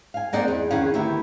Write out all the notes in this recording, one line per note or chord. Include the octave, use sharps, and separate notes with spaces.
F5 G#5
A#3 C4 D#4 D5 D#5 F#5
E2 G#4
E2 D#3 C#4 G#4 F5 F#5
D2 D#3 B3 E4 F#4 G4